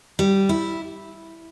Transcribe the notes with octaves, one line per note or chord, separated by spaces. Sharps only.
G3
E4